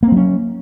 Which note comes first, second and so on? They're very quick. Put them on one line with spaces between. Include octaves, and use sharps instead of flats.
A#3 C4 F#3 C#4